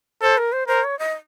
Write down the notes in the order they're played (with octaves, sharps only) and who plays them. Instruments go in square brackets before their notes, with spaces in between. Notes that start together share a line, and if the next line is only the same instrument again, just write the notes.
[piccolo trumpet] A4 [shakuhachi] C5
[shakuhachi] A#4
C5
[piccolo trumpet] A#4 [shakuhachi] C5
[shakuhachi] C#5
D#5